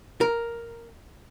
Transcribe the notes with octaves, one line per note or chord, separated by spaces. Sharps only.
A#4